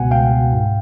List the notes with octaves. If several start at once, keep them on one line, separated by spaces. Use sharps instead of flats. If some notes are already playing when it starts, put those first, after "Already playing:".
Already playing: C#2 B2 F#5 G#5
C#2 F5 G5
B2
G#2